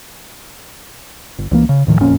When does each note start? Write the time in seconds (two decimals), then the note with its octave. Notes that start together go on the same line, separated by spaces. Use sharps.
1.38 G1
1.51 C#2 E3 A#3
1.69 C#3
1.86 D#1 A2 D#3 F3
2.00 F#1 F2 A#2 C#4